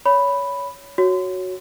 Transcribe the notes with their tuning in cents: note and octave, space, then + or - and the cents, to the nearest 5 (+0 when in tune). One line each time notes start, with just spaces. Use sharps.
C#5 +20 B5 +0
F#4 +0 C#5 +0